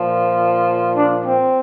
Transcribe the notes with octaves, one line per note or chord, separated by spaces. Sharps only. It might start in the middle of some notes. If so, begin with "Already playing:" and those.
Already playing: A#2 F3
D4
C4